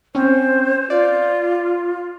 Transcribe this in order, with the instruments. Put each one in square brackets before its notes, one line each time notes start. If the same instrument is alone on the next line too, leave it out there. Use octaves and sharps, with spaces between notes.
[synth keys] C4 C#4 [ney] C5
[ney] F4 [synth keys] D5